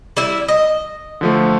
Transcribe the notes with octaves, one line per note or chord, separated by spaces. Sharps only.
G3 E4 E5
D#5
D3 F3 A3